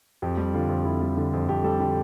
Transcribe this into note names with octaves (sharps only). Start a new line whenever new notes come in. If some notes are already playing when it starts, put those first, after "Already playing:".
F2 G4
G3
D3 F4
F2
F2 E4
G3
D3
F2
F2 G4
G3 A4
D3 G4